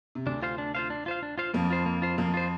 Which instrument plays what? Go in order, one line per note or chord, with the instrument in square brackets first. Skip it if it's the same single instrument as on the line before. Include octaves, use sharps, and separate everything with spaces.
[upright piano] C3
[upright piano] D2 D3 [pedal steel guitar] D4
[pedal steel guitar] F4 C5 F5
D4
F4 C5 F5
D4
F4 C5 F5
D4
F4 C5 F5
[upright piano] F2 F3 [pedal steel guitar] A#3
[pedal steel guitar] F4 C5
A#3
F4 C5
[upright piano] F2 F3 [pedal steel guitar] A#3
[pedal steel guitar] F4 C5